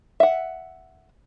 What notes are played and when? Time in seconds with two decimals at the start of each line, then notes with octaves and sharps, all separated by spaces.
0.20 E5 F#5